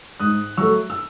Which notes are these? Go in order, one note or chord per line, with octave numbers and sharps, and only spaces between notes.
G#2 D#6 F#6
F#3 A3 C#6 E6
E6